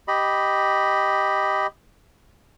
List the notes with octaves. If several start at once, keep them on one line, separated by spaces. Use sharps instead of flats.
G4 D#5 B5